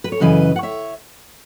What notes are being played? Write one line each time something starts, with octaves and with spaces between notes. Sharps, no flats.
B4
C#5
F#2 C#3 E3 B4 D#5
F#5
C#5 E5